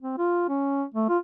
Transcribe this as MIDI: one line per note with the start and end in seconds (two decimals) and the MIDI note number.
0.02 0.18 60
0.18 0.48 65
0.49 0.84 61
0.94 1.09 57
1.09 1.18 65